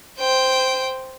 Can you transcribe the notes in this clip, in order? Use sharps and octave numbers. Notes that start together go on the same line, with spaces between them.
C5 G5